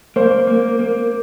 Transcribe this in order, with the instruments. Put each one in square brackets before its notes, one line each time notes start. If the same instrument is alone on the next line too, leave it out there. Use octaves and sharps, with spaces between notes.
[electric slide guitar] A#3 [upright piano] C5
[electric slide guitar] A#3
A#3